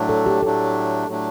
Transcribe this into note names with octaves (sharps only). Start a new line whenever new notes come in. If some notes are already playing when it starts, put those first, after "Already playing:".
Already playing: A2 F#3 A3 D4
A4
G4
A2 F#3 A3 D4 A4
A2 F#3 A3 D4